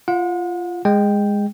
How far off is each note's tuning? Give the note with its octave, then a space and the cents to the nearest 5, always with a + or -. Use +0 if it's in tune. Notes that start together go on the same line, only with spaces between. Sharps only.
F4 -15 F#5 -40
G#3 -15 G5 +0